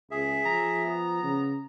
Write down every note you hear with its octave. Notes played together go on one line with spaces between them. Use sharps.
C#2 G#4 E5
F3 A#5
B3
C#3